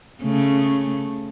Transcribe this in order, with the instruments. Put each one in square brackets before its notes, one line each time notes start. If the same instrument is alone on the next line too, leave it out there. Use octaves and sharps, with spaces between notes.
[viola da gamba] C#3 A3